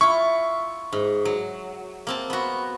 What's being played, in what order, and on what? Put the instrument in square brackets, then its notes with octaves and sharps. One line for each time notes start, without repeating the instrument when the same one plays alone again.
[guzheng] E4 F4 [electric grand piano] C#6
[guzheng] G#2
F#3
A#3 C4 A5
B3 F#4